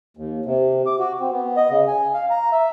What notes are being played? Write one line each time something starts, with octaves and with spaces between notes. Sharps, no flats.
D#2
C3
D6
F#4
C4
B3
D#5
C#3
G#5
F5
A#5
E5